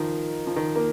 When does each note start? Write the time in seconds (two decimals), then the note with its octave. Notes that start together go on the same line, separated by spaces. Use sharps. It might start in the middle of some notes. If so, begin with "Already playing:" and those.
Already playing: D#3 F3
0.47 F3
0.56 D#3
0.76 A#3